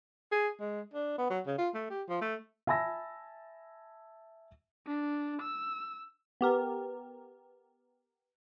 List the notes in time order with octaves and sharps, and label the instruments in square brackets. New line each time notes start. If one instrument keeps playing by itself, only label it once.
[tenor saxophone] G#4
G#3
D4
B3
F#3
C#3
F4
A3
G4
F3
A3
[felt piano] E5 G#5 A5 B5 E6 A#6
[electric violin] D4
E6
[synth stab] B3 G4 A#4